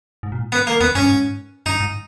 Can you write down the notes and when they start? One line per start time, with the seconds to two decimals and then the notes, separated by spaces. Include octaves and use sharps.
0.23 G#2
0.32 A#2
0.40 G#2
0.52 B3
0.67 A#3
0.80 E2 B3
0.95 G2 C#4
1.09 G#2
1.66 G2 D#4
1.80 G#2